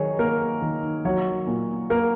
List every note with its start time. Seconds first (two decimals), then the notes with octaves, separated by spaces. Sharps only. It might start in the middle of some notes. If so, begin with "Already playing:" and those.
Already playing: D#3 F#3 D#4 G#4 C#5
0.19 A#3 A#4
0.62 D#3
1.05 F#3 C#5
1.47 A#2
1.90 A#3 A#4